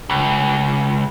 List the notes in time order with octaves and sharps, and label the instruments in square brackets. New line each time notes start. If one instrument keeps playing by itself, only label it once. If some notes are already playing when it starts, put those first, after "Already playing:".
[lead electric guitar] C#2